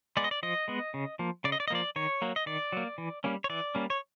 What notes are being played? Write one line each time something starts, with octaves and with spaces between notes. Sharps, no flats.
G#3 B3 D5
D#5
D5
F3 D#5
G#3 B3
C#3
F3 A#3
C#3 D5
D#5
D5
D#5
F3 A#3 D5
D#3 C#5
F#3 A#3
D#5
D#3 D5
F#3 A#3
E3
G3 A#3 C#4
C#5
E3 D5
G3 A#3 C#4
C#5